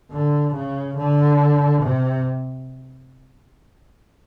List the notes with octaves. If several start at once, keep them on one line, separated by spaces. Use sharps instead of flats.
D3
C#3
D3
C3